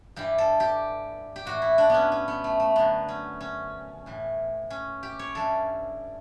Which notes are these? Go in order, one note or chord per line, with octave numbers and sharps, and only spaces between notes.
G2 E3 G4
A4
G4
G4
A2 E3 F#4
E4
D4
B3 C#4
C#4
B3
A3
A3
F#2 D3 B3
C#4
C#4
A2 E3
C#4
G4
C#5
G2 E3 A4